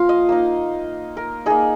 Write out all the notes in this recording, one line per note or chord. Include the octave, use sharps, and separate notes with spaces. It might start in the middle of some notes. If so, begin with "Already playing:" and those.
Already playing: F3 A#3 F4 F5
D#5
A#3 D#4
A#4
A#3 D#4 G#4